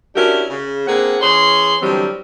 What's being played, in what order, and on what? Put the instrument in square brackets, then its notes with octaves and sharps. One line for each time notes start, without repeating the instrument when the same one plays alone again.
[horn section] C#4 D4 E4 F#4 G4 A#4
C#3
A#3 C4 D4 G#4 F#5
E3 C#4 G#4 C6
D3 E3 F#3 G3 C4